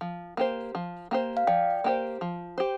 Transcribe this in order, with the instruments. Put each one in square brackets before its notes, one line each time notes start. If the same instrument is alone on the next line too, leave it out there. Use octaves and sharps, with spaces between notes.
[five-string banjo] F3
A#3 G4 C5
F3
A#3 G4 C5
[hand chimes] F5
[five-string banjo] F3 [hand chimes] D5 G5
[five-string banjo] A#3 G4 C5
F3
G4 C5